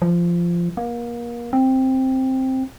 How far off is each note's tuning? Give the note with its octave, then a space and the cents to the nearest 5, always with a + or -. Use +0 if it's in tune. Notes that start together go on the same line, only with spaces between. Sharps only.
F3 -15
A#3 +30
C4 +5